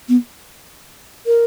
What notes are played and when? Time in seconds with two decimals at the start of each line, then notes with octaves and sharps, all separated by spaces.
0.09 B3
1.26 A#4